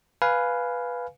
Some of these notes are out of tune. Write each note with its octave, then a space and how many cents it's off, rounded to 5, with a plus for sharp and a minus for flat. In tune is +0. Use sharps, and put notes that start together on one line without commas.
B4 +0 F5 +0 G#5 +10